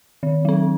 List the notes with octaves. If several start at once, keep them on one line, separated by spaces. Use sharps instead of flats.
D#3
F#3 C4